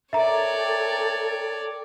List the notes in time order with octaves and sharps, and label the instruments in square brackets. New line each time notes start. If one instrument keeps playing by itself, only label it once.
[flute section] A4 A#4 G5 [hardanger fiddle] C#5 D5 [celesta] E5 A#5